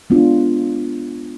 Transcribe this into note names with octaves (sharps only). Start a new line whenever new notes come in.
G#3 B3 D4 F4